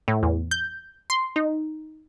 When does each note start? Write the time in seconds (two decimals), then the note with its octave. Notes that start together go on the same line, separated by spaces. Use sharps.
0.08 A2
0.23 E2
0.51 G6
1.10 C6
1.36 D#4